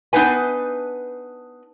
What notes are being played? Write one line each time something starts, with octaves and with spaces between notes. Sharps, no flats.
B3 D4 D#4 B4 G#5